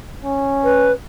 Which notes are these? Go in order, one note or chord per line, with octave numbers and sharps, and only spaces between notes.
C#4
B4